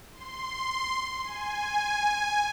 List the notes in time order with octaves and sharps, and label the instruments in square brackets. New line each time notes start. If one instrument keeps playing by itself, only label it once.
[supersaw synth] C6
G#5